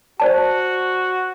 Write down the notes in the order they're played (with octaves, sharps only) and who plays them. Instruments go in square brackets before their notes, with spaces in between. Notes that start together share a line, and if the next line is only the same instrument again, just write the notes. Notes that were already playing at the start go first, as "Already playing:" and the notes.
[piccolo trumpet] F#4 [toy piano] C5 D5 A5